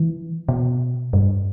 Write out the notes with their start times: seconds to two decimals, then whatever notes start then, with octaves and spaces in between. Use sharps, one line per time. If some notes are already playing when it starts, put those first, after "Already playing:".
Already playing: E3
0.49 B2
1.13 G2